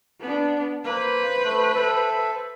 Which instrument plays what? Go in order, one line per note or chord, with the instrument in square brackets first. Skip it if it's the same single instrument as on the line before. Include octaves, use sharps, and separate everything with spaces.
[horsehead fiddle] B3 D4
[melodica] A#3 [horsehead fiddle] B4 C5
[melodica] A3
A4 E5